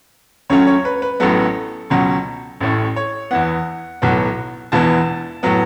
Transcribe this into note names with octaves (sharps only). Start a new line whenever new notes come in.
C#2 C#3 F#3 A3 C#4 C#5
C#5
B4
B4
A1 A2 F#3 B3 A4
C#2 B2 F#3 C#4
A1 A2 A3 C#4 A4
C#5
E2 E3 B3 F#5
B1 A2 F#3 B3
E1 E2 E3 B3 A5
A2 F#3 B3